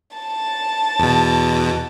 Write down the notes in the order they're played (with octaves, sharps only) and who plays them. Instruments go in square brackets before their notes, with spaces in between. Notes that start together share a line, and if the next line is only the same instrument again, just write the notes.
[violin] A5
[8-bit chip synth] E2 B2